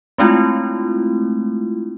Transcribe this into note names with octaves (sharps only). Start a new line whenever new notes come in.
G#3 A3 C4 D4 E4 F4